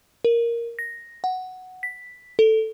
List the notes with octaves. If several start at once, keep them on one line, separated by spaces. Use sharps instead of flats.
A#4
A#6
F#5
B6
A4